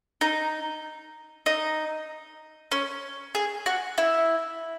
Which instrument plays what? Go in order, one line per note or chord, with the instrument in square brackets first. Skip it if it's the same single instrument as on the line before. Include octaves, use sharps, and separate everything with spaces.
[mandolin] D#4
D#4
C#4
G#4
F#4
E4